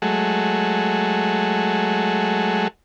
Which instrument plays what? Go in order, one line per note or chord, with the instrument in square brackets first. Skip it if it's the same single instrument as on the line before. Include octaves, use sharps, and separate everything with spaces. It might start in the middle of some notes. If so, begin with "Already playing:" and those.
[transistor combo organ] F#3 G#3 A3